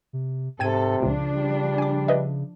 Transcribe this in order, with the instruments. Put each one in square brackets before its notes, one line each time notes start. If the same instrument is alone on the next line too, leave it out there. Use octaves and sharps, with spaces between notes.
[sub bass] C3
[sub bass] G#2 [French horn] C3 [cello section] A4 [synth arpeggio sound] G5 G#6 D#7
[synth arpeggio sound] C#2 A#2 [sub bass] C#3 [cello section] F3 D4
[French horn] G3
[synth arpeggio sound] G#5 D6
B4 D#5 E5